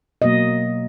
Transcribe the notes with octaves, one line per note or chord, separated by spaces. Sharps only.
B2 F#3 A#3 D#5